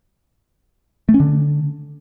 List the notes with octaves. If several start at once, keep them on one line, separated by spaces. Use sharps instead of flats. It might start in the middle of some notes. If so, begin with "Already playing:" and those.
A3
C#4
D3